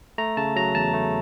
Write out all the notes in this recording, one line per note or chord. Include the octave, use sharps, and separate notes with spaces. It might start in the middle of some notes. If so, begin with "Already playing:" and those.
A3 A#5
C#3 A5
F#3 A#5
E2 A5
A3